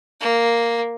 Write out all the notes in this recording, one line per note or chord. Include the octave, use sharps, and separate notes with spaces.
A#3